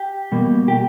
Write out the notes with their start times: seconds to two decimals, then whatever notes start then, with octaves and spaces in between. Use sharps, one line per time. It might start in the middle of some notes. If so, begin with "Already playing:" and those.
Already playing: G4
0.32 B2 G3 A#3
0.68 G4